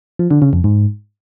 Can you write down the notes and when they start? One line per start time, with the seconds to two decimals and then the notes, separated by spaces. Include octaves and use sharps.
0.19 F3
0.31 D3
0.42 C#3
0.53 F2
0.64 G#2